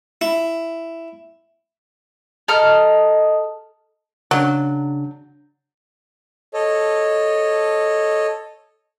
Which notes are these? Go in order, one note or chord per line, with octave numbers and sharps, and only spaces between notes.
E4
A4 D#5 A#5 D#6 F6
C#3 F#3 D4
A4 C#5 D#5